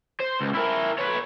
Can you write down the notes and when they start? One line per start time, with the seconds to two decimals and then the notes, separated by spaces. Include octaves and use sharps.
0.20 C5
0.41 C#2
0.55 E4 A#4
0.99 B4 C#5